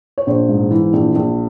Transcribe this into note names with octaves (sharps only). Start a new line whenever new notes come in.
C#5
A#1 C5
G#2
E3
A#1
A#1